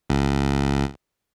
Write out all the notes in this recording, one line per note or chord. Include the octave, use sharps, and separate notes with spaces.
C#2